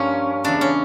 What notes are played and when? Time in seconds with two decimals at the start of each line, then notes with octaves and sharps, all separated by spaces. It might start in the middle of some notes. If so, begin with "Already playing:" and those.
Already playing: G2 F3 A#3 C#4
0.44 E2 C#3 E3 D4
0.61 C#4